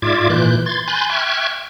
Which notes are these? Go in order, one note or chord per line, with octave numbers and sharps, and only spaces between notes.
G#2 F4 D5 E5 D6 G#6
A#2 E3 F#6 G6
C6 G#6 A6
G#5 B5 C6 F#6 G6 A6
E5 G5 C#6 F6 F#6 G#6